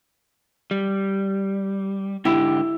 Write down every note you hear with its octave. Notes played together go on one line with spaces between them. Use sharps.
G3
G#2 D3 E4 G4